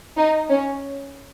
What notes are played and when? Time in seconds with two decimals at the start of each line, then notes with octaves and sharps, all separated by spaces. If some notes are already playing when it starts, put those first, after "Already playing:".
0.17 D#4
0.49 C#4